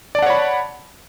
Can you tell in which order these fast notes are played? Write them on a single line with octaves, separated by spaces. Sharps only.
D5 A5 F#5 C#5 B5